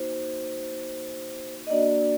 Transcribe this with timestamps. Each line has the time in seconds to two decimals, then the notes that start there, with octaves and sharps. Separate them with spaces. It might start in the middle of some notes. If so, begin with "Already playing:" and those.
Already playing: A#3 D#4 F#4 C5
1.67 D#5
1.70 A#3 D4 F#4 D5